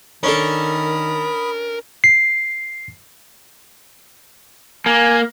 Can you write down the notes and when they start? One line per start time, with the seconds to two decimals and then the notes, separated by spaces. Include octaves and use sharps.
0.23 D#3 C#4 D4 A4 A#4 B5 D#6
2.04 C7
4.86 A#3 G#5